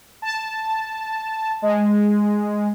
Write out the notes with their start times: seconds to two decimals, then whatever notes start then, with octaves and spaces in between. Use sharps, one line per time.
0.22 A5
1.62 G#3